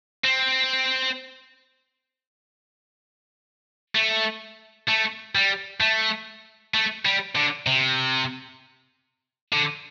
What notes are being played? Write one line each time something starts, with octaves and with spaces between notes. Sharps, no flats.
C4
A3
A3
G3
A3
A3
G3
D3
C3
D3